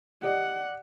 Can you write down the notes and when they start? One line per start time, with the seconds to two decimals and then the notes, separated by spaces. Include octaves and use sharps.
0.23 G4 D5 D#5 F#5